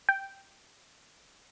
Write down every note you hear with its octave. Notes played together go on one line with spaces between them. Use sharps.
G5